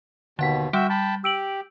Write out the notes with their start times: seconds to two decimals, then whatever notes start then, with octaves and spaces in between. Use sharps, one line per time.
0.39 D#2 B2 D3 F#5 B6
0.73 G3 F#4 E5 G5
0.90 G5 A5 B5
1.24 G4 E6 D7 F#7